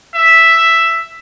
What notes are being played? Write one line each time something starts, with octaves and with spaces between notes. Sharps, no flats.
E5